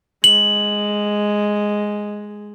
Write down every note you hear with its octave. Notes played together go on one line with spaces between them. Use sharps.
G#3 F#7